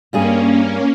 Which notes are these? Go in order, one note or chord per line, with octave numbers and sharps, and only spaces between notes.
G2 G3 A#3 C#4 G#4